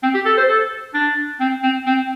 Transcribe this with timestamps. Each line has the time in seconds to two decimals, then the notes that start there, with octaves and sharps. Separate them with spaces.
0.03 C4
0.15 G4
0.26 A4
0.38 C5
0.49 A4
0.94 D4
1.40 C4
1.63 C4
1.86 C4